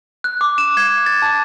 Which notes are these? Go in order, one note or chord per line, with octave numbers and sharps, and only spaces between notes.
F#6
D6
E7
G#6
A6
A5